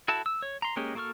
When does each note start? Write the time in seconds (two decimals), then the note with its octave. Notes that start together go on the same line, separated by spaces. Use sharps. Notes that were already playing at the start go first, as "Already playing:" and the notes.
0.08 E4 F#4 A4 A5
0.26 E6
0.42 C#5
0.62 A#5 C6
0.76 G#3 A#3 C#4 G4 G#4
0.95 A#3 F#4 A4 C#6 F6